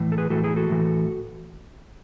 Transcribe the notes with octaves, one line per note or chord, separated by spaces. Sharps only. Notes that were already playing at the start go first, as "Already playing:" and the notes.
Already playing: A2 E3
A4
G#4 B4
A2 E3 F#4 A4
E4 G#4
F#4 A4
A2 E3